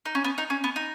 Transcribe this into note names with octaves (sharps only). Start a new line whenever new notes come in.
D#4
C#4
B3
D#4
C#4
B3
D#4